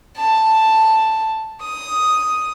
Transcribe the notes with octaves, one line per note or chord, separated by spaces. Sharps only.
A5
D#6